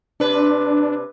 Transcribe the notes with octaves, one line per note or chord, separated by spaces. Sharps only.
C3 D4 B4